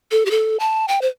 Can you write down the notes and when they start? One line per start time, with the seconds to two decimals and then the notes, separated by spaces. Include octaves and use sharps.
0.11 A4
0.26 G4
0.31 A4
0.60 A5
0.88 G5
1.02 C5